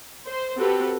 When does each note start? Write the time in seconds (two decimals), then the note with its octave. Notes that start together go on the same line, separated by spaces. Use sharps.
0.25 C5
0.57 C4 F#4 G4 A4 B4